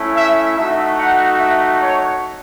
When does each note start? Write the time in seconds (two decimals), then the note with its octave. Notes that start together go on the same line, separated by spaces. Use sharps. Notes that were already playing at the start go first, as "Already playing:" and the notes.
Already playing: A3 C#4 E4
0.15 E5
0.57 A3 D#4 F#4 E5
0.98 F#5
1.39 E5
1.80 C#5